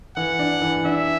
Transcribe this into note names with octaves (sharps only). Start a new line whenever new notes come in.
E3 F#5
D4
E3
D4 E5